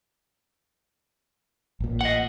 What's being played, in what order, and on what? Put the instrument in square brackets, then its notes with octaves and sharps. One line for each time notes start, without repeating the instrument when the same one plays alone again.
[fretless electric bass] A1 A#2
[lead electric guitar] D#5 F#5